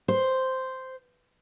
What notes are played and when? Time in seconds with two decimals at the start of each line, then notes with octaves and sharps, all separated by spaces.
0.08 C5